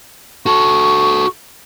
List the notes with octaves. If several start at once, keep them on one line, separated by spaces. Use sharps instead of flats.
F#4 A4 C#6